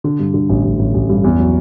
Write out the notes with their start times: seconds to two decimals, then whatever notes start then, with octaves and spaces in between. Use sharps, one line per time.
0.04 D3
0.19 G2
0.34 D3
0.49 A1
0.64 A1
0.79 A1
0.94 A1
1.09 G2
1.24 E2
1.39 F#3